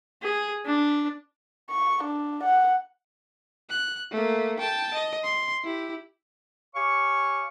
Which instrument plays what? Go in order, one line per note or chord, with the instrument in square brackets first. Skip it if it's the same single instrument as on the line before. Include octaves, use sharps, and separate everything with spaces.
[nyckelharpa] G#4
D4
[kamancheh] C#6
D4
F#5
[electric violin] F#6
A3 A#3
G5 A5
D#5
C6
E4 G4
[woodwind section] G4 C#5 F5 G#5 C#6